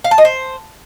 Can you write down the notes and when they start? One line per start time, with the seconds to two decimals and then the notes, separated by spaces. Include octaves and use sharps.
0.04 F5
0.11 A5
0.18 D#5
0.25 C5